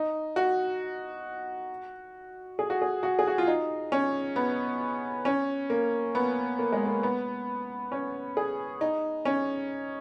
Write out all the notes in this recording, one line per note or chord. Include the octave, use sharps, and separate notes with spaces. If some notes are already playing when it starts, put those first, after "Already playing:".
Already playing: D#4
F#4
G#4
F#4
G#4
F#4
G#4
F#4
F4
D#4
C#4
B3
C#4
A#3
B3
A#3
G#3
A#3
B3
C#4
G#4
D#4
C#4